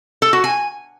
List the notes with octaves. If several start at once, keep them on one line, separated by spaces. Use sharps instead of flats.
A4
F#4
G#5